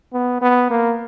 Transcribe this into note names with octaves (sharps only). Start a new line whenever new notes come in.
B3
B3
A#3